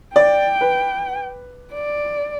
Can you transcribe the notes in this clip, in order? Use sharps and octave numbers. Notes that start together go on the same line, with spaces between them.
D5 G5
B4
D5